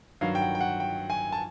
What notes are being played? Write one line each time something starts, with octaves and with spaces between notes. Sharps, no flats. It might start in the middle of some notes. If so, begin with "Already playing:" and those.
G2 D#3 F#3 F5
G5
F#5
G5
F#5
G5
G#5
A5